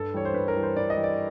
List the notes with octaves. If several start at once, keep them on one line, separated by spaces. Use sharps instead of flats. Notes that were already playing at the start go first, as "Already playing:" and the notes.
Already playing: G2 A4
E3 G3 C#5
C5
G2 B4
A#4
E3 G3
C5
G2 D5
D#5
E3 G3
D5